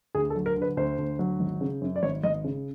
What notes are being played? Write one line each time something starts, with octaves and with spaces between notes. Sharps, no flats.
D2 G#4
A4
F#3
A#4
D3
B4
D2 C5
D2
F#3
G#1
C#3
F#2
D5
G#1 C#5
G#1 D#5
C#3